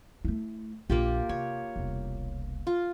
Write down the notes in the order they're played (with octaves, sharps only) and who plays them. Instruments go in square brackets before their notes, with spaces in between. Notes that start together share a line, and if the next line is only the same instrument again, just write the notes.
[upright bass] A3 E4
[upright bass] A#1 F2 [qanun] A#3 F4 G4
[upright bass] C3 [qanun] C#5
[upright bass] E1 C2
[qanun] F4